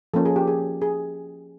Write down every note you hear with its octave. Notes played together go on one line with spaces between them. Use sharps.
F3 A#3 C#4 A4
G#4
G4
G#4
G#4